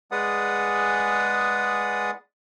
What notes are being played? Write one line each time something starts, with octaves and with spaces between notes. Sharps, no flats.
G#3 G#4 B4 D5 F#5 D#6